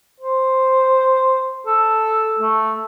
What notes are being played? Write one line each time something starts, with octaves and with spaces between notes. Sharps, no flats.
C5
A4
A3